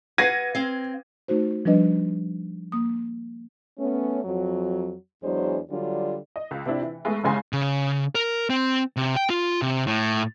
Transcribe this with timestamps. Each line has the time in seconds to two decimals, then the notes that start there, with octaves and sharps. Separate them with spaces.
0.18 B4 F5 F#5 G#6 A#6 D#7
0.55 C4 F5
1.28 A3 D#4 F#4 C5
1.65 F3 G3 D4 B4 D#5
2.72 A#3 D#6
3.78 A3 B3 C#4
4.24 F2 F#3
5.22 E2 F#3 G#3 D4 C5
5.69 D3 F#3 G3 D4 F4
6.36 D#5
6.51 C#2
6.66 C3 C4 D4 E4
6.81 E3
7.05 G#3 A3 B3
7.24 G1 C2 C#3 G#3 G#5 C6
7.53 C#3
8.15 A#4
8.50 C4
8.97 C3
9.16 G5
9.30 F4
9.62 C3
9.87 A2